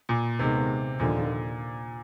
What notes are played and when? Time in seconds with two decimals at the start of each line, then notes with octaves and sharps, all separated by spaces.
0.09 A#2
0.39 D#2 C3 D#3 G#3 B3
1.00 D#2 A#2 D3 F3